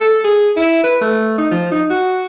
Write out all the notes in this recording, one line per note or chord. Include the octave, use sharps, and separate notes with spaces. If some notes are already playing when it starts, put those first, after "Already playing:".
A4
G#4
E4
B4
A3
D#4
F3
D#4
F#4